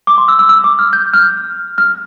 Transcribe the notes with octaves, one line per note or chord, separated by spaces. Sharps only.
D6
C6
E6
E6
E6
D6
F6
G6
F6
F6